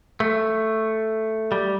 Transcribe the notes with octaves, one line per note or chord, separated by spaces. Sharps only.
A3
G3